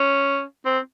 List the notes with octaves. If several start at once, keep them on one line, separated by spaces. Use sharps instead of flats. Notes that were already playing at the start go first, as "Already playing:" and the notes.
Already playing: C#4
C4